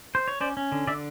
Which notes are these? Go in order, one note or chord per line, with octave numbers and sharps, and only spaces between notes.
C5
C#5
C#4 C5 D5
C#4
D3
D3 D5 E5